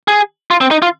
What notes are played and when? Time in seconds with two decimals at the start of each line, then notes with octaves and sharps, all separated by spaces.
0.08 G#4
0.51 F4
0.61 C4
0.71 D#4
0.82 F4